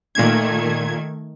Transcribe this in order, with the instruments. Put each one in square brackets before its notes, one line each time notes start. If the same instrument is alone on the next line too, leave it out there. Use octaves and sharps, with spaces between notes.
[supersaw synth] A#2 G#6 [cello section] D#3 A3